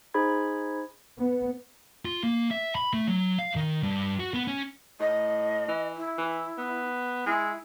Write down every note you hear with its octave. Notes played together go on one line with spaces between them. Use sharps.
D#4 G#4 C5 B5 G#6
B3
F4
A#3
E5
B5
A3
F#3
F5
D#3
G2
F#4
B3
C#4
A2 D#5
E3
E4
E3
B3
G#3 E4